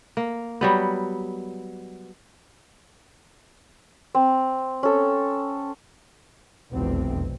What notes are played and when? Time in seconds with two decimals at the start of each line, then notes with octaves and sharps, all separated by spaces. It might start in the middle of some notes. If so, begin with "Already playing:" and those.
0.17 A#3
0.61 F#3 G3 B3
4.15 C4
4.83 C#4 A4
6.73 F1 B1 E2 B2 C4